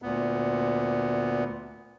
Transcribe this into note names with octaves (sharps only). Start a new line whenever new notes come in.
D2 A#2 B3